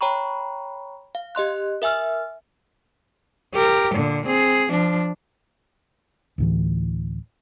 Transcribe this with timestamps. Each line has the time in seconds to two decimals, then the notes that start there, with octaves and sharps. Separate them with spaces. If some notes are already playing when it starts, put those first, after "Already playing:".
0.01 C#5 G5 A#5 B5 C#6
1.15 F5
1.35 G4 D#5 C6 F#6
1.82 A#4 E5 G#5 E6 F6
3.54 G4 A#4
3.94 A#2 D3
4.26 C4 G#4
4.70 F3 D4
6.38 D2 A2 E3